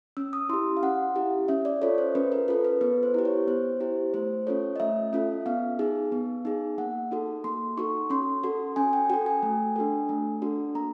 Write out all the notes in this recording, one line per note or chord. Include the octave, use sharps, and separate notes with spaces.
C#4 E6
D#6
E4 G4 C6
F5
C#4 F#5
E4 G4
C#4 E5
D5
F4 A4 C#5
C5
C#4 B4
A#4
F4 A4 B4
B4
B3 B4
C5
E4 G4
C#5
B3 C5
E4 G4 C5
A3 C5
C#4 F4 A4 C#5
D#5
A3 E5
C#4 F4 A4
B3 F5
D#4 G#4
B3
D#4 G#4
A#3 F#5
D#4 F#4 A4
A#3 C6
D#4 F#4 A4 C#6
C#4 C6
F#4 A4
C#4 G#5
G5
F#4 A4 G5
G#5
A3
D4 F#4 A4
A3
D4 F#4 A4
A#3 A#5